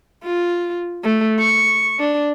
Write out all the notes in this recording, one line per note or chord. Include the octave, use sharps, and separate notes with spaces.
F4
A3
C#6
D4